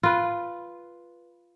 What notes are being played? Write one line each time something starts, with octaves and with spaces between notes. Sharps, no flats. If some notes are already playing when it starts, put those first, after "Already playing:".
F4 B4